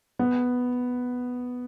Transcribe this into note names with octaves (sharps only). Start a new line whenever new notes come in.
B3